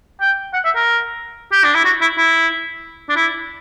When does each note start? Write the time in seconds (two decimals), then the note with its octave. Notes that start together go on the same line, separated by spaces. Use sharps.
0.21 G5
0.53 F#5
0.65 E5
0.75 A#4
1.52 G4
1.64 D4
1.74 E4
1.85 F#4
2.01 E4
2.18 E4
3.09 D4
3.16 E4